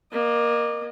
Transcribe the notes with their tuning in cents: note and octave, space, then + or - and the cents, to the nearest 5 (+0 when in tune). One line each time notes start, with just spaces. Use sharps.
A#3 +15 D#5 -30